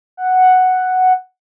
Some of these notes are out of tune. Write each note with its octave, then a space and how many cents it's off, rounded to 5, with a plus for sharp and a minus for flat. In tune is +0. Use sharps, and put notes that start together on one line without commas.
F#5 +0